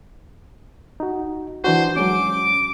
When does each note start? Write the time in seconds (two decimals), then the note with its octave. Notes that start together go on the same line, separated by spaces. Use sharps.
1.00 D#4 F#4
1.64 E3 D4 F#4 C5
1.97 F#3 G#3 C#4 D6